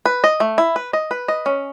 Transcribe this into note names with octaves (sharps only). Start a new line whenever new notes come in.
B4
D#5
A3
E4
B4
D#5
B4
D#5
C#4